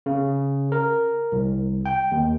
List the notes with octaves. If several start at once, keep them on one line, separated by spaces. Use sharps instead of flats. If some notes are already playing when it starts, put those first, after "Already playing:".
C#3
A#4
C2
G5
D#2